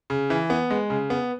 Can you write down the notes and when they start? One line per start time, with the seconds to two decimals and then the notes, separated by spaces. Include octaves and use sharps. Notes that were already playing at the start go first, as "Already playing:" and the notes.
0.10 C#3
0.30 E3
0.50 B3
0.70 G#3
0.90 C#3
1.10 B3